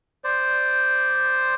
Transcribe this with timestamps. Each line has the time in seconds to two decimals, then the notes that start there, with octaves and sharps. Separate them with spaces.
0.24 C5 D5